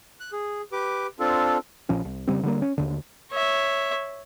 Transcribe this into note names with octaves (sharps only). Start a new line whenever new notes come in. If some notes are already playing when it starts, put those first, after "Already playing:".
F#6
G#4
G4 B4 D6
C4 D4 F4 A4
A#1 A#2 F3 C#4
C2
F1 C#3 G3 C4
D3 G3 A#3
C#4
D#2 D3
C#5 E5